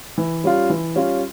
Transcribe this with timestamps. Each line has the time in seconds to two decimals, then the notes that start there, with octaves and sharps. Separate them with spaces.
0.18 E3
0.44 G3 C#4 F4
0.70 E3
0.95 G3 C#4 F4